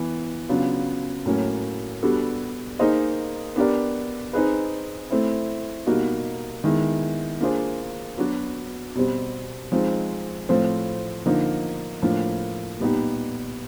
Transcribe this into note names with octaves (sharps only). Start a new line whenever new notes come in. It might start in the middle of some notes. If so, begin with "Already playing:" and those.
Already playing: E3 B3
C#3 F#3 B3 D4 F4
A2 F#3 A#3 C#4
G3 B3 D4 F#4 A4
A#3 D#4 G#4 C5 D#5
B3 D4 G4 A#4 D5
C4 D#4 G#4 B4
A3 C4 E4
B2 G3 A#3 D#4 F#4
D#3 G#3 B3 E4
A#3 D4 F4 G#4 C5
F#3 B3 D4 F#4
B2 G3 C4
F3 G#3 C4 D#4
A2 F3 A3 C4
D3 F3 A#3 D#4
A2 F3 A#3 D4
A#2 G3 B3 D#4 G4